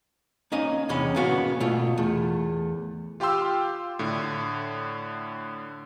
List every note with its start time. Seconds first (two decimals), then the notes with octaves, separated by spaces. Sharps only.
0.52 A#3 C#4 D#4 D#5
0.89 E2 C3 C#4 B5
1.16 A#3 B3 C#4 F#4
1.60 B2 A3 F4
1.98 E2 A3
3.20 F4 G4 F5 G5 C6 E6
3.99 A2 D3